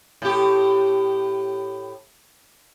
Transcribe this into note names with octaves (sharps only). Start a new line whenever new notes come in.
A2 G4